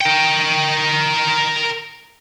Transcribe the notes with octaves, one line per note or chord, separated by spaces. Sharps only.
A#4 G5